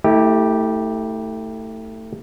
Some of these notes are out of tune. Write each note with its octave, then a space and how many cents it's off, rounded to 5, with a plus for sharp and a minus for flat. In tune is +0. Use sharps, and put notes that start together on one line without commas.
A3 +20 E4 -35 G4 +0